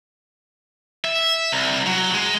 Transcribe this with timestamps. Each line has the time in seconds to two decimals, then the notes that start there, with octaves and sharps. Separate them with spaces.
1.05 E5
1.52 C2
1.86 F#3
2.14 G#3